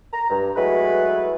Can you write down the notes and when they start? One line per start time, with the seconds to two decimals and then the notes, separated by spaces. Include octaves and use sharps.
0.13 A#5
0.30 G2
0.56 F#3 G#3 A3 E4 B4